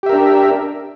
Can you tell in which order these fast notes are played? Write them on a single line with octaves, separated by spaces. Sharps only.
G4 E5 A#4 D4